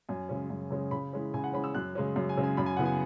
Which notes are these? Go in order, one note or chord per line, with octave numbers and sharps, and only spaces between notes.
F#2 G#5
C#3 G#3 C#4
F#2
C#3 G#3 C#4
C#3 B5
E3 G#3 C#4
C#3 G#5
F#5
E3 G#3 C#4 B5
E6
F#2 F#6
C#3 G#3 C#4
F#2
G#5
C#3 G#3 C#4
G#5
F#2 B5
G#5
C#3 E3 B3 F#5
G#5